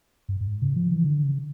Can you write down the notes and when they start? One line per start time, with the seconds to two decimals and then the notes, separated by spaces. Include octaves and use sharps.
0.29 G2
0.41 G2
0.47 G#2
0.62 C#3
0.76 F3
0.91 E3
1.04 D3
1.24 C#3